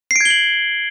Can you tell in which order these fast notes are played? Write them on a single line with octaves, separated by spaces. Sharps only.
C7 D7 G#6 G7 F#7